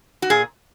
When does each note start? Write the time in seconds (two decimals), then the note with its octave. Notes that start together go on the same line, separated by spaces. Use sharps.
0.22 F#4
0.30 A#2 G#4